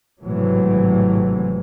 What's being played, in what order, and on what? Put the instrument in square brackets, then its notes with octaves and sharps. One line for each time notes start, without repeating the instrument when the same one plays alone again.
[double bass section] G#1 A2 C3 E3 F#3